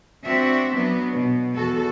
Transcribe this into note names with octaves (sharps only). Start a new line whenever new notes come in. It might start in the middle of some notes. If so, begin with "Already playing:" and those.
C4 D4 F#4 E5
F#3 B3 D4
B2
E2 F#4 A4